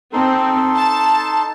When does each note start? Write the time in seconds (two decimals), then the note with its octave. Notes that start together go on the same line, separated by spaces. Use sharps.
0.13 C4 D#4 A4 C6
0.76 A5